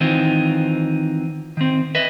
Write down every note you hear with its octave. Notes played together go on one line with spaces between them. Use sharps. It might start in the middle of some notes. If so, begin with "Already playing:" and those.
D#3 E3 C4 D#4 F4
D#3 C4
B4 D#5 E5